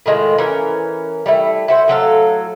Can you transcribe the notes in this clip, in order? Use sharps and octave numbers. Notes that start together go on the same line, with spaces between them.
A2 D#3 G#3 F4
E3 C#4 A#4
G3 A3 E4
E4 F#4 C5
A2 F#3 A4 F5